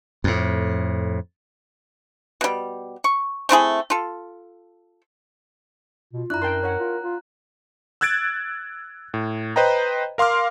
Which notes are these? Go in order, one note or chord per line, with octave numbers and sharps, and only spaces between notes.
F2 A2
B2 G3
C#6
A3 C4 E4 G#4
F4 A4
B2 F4
F#2 D4 E4 A#5 F#6
A#4 G5 A5 C6
C#5 F#5
F4
F4
E6 F#6 G#6 A6 D7
A2
B4 C5 D#5 G5 A#5
A#4 F5 C6 D6 F6